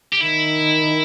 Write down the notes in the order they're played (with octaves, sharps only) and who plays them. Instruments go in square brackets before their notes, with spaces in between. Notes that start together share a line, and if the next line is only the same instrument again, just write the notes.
[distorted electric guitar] G4
[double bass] D#3 [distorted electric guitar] E4